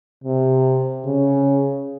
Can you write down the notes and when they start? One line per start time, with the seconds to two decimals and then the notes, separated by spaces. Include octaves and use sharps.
0.24 C3
1.05 C#3